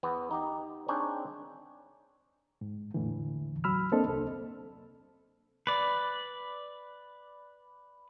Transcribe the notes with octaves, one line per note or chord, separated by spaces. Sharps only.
E2 B3
D#4 G4 D#5
C4 D4 D#4 G#4 C#5 G5
G#2
E2 A2 D3 E3
F#3 B5 E6 F6
A#3 C4 D4 A4 C5 D#5
C2 A4
B4 D5